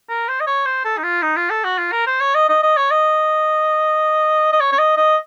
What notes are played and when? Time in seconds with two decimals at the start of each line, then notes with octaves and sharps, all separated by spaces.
0.09 A#4
0.28 C5
0.40 D#5
0.47 C#5
0.66 C5
0.84 A4
0.97 D#4
1.03 F4
1.22 D#4
1.36 F4
1.50 A4
1.64 F#4
1.78 F4
1.92 A#4
2.07 C5
2.20 C#5
2.35 D#5
2.49 D#5
2.63 D#5
2.77 C#5
2.91 D#5
4.53 D#5
4.60 C#5
4.72 C#5
4.79 D#5
4.97 D#5